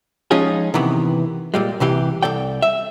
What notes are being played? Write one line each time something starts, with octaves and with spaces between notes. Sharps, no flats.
F3 G#3 C#4 D#4 F4 G#4
C3 D#3 E3 B3
A#2 G3 G#3
C2 C3 E3 G4
C2 F#2 A4 D5 G5
E5